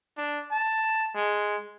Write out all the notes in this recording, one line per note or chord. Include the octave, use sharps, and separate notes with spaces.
D4
A5
G#3